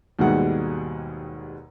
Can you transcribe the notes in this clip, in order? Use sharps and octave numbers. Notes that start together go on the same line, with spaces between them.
D#2 G#2 B2 G3 G#3 F#5